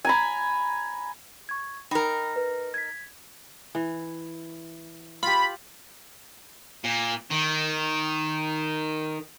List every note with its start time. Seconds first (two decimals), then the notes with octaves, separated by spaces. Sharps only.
0.05 G#5 A#5 B5
1.49 C#6 G#6
1.91 D#4 A#4 G5 B5
2.36 B4
2.74 G#6 B6
3.75 E3
5.23 F4 G4 B5
6.84 A#2
7.30 D#3